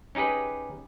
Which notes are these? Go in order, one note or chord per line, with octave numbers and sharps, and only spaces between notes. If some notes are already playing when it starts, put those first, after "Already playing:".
C#4 D#4 G4 G#4 B4